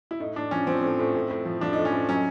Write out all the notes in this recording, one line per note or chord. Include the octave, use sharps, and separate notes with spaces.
E4
A2 D#4
A2 D4
F3 C#4
F3 C4
A2
A2
A2
A2
F3
F3 D4
A2 D#4
C#4
A2
F#3 C#4